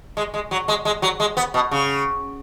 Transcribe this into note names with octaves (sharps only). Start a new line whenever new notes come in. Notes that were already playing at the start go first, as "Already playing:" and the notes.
G#3
G#3
F#3
G#3
G#3
F#3
G#3
B3
B2
C#3